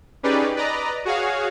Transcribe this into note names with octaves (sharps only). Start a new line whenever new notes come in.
C#4 D#4 G4 G#4 B4 D5
B4 D5 D#5 A#5
F#4 G#4 C#5 F5